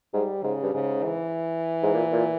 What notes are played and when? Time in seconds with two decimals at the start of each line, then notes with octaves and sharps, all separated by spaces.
0.13 G#2 G3
0.44 G#2 C#3
0.63 G2
0.73 G#2 C#3
1.04 E3
1.83 G#2
1.94 A#2
2.12 A#2